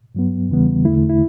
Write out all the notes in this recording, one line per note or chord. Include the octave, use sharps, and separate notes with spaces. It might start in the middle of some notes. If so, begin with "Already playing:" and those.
G2 F#3 B3
E2 C#3 E3 G3 B3
E2 D3 A3 E4
E4